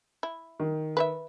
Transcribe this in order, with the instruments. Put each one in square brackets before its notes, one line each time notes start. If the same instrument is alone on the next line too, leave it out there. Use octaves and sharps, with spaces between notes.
[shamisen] E4
[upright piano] D#3
[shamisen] B4 C#5 E5